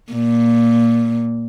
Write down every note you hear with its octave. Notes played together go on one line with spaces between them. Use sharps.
A#2